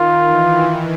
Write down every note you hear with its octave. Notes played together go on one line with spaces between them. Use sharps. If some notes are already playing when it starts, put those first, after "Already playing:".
Already playing: D#3 F4
E3